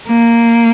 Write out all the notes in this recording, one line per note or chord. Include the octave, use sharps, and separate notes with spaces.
A#3